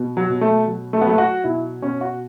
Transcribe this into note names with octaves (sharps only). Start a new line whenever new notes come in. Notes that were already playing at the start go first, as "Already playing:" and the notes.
Already playing: B2
F#3
B2
A3
F#3
A3
B3
F#3 A3
F#4
B2 E4
B2 C#4
F#4